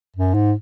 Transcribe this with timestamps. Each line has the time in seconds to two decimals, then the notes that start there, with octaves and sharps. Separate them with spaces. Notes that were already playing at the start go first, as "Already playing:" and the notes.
0.16 F#2
0.34 G#2